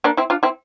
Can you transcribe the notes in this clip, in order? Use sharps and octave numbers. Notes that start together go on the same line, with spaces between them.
A#3 D4
C4 E4
D4 F4
C4 E4